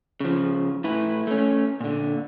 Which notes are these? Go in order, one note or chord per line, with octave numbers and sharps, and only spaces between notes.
C#3 F3
A2 E4 B4
A3 C#4
A#2 D3